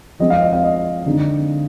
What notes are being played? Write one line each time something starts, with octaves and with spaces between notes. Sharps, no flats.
F3 G#3 C4 D#5
F5
D#5
F5
D#5
D3 G#3 C4 D#4